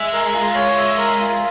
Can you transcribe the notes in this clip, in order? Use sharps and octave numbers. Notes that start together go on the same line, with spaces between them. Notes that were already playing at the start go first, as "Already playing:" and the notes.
Already playing: G#3 E5
A#4
F4
C#5
E5
A#4
F4